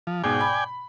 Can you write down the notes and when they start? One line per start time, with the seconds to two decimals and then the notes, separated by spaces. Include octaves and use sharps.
0.07 F3
0.24 G#2 B2 D5 G5 G#5
0.41 B5